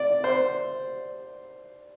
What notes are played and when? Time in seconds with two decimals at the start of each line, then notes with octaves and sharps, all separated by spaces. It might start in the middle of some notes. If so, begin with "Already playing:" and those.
Already playing: D5
0.24 C5